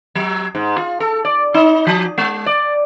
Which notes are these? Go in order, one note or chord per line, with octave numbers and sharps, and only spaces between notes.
F#3
G#2
F4
A4
D5
D#4
F3
G#3
D5